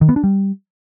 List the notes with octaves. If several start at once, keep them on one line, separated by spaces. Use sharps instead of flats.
D#3
B3
D4
G3